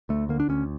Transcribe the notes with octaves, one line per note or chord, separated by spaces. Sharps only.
D2 A3
D3 A#3
D4
D2 C#4